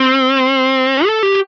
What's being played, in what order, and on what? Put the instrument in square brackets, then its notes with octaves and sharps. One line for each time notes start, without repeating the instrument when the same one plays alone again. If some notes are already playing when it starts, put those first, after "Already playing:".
Already playing: [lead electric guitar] C4
A4
G4